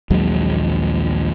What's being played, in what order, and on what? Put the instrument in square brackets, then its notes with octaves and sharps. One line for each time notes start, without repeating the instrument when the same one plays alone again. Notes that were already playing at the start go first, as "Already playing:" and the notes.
[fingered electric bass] A#1 D#2 F#3 G#3